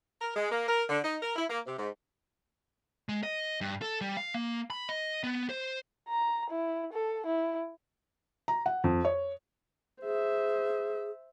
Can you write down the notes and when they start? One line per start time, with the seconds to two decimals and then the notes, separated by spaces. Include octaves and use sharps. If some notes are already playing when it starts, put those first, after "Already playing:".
0.21 A#4
0.36 G#3
0.51 A#3
0.68 A#4
0.89 D3
1.04 D#4
1.22 A#4
1.36 E4
1.50 A#3
1.66 C3
1.78 G#2
3.09 G#3
3.23 D#5
3.61 G2
3.82 A4
4.01 G3
4.17 F5
4.34 A#3
4.70 B5
4.89 D#5
5.23 B3
5.49 C5
6.08 A#5
6.50 E4
6.93 A4
7.26 E4
8.48 A#5
8.66 F#5
8.84 F2
9.05 C#5
10.02 G#4 C5 E5